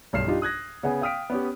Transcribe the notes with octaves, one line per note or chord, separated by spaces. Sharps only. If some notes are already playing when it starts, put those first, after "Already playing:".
B1 G2 F6 C7 E7
G3 D4 D#4 F4 G4
D#6 F#6 G#6 A#6
C#3 B3 F#5 G#5
F5 G5 D#6 F6 B6 D7
B3 C#4 G4